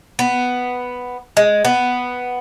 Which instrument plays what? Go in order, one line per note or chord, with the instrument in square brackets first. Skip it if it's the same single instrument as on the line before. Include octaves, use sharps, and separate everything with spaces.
[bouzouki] B3
G#3
B3